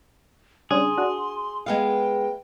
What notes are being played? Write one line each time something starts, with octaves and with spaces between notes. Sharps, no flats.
C#3 G3 D4 G#4 C6
D4 F#4
G#3 B3 F5 G5